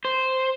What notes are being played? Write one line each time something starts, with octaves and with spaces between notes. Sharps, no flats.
C5